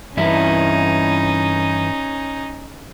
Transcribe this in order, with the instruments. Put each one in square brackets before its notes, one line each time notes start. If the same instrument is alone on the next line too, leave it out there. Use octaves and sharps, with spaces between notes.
[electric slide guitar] G2 E3 E4 [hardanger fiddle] C#4 D#4